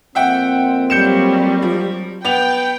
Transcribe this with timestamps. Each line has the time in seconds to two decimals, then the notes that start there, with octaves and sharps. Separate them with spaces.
0.15 F2 A#3 C4 E5 F#5 G5
0.90 F#3 G3 G6 C#7 E7
1.62 F3
2.24 B3 G5 F7